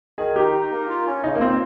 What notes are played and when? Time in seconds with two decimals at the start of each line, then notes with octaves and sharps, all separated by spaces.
0.17 D#3 G#4
0.36 D#4 G4
0.53 D#4
0.71 A#3
0.88 F4
1.06 C#4
1.23 C#3 D#4
1.35 A#3
1.41 C4 F4